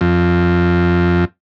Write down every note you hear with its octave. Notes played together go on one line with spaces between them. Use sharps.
F2